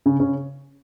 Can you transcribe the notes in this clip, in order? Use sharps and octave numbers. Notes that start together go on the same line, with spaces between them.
C#3 C#4
C#3 C#4